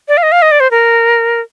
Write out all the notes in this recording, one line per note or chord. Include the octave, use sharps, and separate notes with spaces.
D5
F5
D#5
F5
D#5
D5
C5
A#4